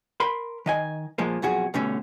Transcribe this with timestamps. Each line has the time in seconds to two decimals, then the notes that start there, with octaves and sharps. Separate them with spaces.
0.20 A#4 B5 C6
0.66 D#3 D#5 G#5
1.18 A#2 F3 G#3 A#3
1.42 B1 F2 F#4 G#4
1.74 G2 B2 D3 A3 C#4